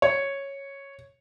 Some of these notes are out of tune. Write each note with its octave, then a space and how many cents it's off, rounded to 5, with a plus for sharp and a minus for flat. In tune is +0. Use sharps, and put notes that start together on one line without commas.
C#5 -5